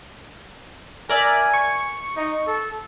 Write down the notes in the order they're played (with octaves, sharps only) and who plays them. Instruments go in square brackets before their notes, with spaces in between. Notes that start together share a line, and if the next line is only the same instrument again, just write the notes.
[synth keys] A#4 D5 E5 [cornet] G#5
[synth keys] C#6
[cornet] D#4
A4